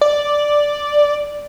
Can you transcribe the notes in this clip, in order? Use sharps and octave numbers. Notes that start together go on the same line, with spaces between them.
D5